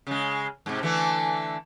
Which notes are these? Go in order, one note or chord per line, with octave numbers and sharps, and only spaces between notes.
C#3 G#3
G#2 C3
D3 E3 A3